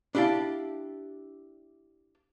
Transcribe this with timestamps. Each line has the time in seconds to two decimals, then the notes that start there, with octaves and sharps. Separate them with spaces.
0.15 D4 E4 G4 F5 A5